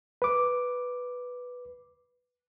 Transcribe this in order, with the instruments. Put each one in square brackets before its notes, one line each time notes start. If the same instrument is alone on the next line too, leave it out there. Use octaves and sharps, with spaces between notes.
[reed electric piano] B4 D6